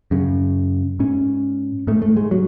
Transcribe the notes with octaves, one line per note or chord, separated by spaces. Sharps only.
F#2 C#3
G#2 C#4
G#2 A3
A3
G#3
F#3